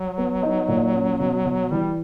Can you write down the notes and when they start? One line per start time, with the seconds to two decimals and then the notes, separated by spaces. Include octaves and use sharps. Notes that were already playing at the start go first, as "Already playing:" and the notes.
Already playing: F#3
0.18 B3
0.43 D#4
0.68 A#2
0.95 C#4
1.20 B2
1.45 B2
1.71 E3 G3